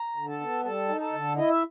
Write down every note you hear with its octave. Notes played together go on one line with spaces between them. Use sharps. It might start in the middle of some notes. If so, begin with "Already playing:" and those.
Already playing: A#5
D3
A4 A5
B3
G3 A4 A5
D#4
A4 A5
D3
E4 D#5
E5